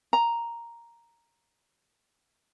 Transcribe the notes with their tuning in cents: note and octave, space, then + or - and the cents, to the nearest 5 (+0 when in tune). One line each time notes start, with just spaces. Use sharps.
A#5 +0